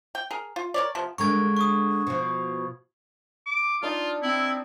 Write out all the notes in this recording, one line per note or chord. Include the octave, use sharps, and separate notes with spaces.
G5
G#4 A#4
F4
A#4 C#5 D5
C3 F3 B3
D3 G#3 A#4 C#6 G#6
C#6 D#6
B2 F3
D6
D4 D#4 F4 D5
C4 E4